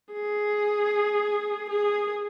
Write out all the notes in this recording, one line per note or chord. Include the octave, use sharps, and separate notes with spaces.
G#4
G#4